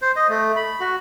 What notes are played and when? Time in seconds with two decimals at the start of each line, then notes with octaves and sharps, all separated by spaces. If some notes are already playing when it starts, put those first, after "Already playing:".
0.02 C5
0.16 D#5
0.29 A3
0.56 B5
0.80 F#4